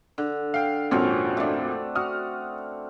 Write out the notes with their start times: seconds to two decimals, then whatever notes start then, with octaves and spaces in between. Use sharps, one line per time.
0.18 D3
0.54 F5 G5
0.91 G#1 F2 A#2 C4 C#4 F#4
1.37 A3 D4
1.95 F#4 D#6 F6